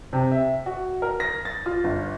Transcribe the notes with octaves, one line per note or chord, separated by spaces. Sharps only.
C3
E5
F#4
A#4
A#6
A6
F4
G1